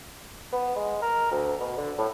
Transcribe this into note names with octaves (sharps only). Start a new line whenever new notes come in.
B3
G#3
A#4
D2
B2
D3
A2